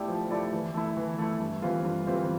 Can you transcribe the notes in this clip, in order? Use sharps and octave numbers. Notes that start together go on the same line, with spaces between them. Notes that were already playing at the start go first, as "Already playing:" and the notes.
Already playing: A3 E4 G4 D5
F3
A3 E4 G4 D5
E3
A3 E4
E3
A3 E4
G2
E3 G3 C4 F4
G2
E3 G3 C4 F4